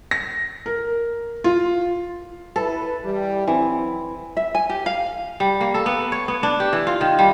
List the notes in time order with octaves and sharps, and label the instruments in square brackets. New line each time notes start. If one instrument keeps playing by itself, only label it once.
[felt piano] A#6
A#4
F4
[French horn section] E4 B4 [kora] A4
[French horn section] E3 G3
[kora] E3 [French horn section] F#3 C4
[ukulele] E5
G#5
G4
F5
[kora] G3
A#3
A4
B3
C#5
B3
D4
G4
E3
F4
D#3
G3